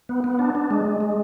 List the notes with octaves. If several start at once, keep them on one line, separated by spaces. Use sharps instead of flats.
B3
B3
D4
D4
G#3
G#3
G#3